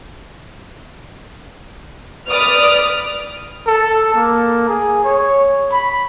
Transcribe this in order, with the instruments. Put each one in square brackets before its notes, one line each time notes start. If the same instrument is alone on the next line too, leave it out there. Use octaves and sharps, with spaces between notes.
[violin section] B4 D5 D#6 F6
[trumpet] A4
A#3
G#4
C#5
B5